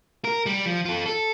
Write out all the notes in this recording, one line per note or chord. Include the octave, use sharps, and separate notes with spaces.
A#4
G3
F3
F4 A4
A4